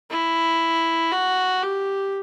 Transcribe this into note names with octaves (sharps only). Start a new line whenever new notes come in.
E4
F#4
G4